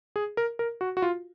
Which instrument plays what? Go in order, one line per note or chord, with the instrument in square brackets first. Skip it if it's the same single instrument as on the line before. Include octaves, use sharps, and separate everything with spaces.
[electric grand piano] G#4
A#4
A#4
F#4
F#4
F4